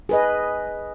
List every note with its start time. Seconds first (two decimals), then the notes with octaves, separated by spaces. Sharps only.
0.09 G#4 B4 D#5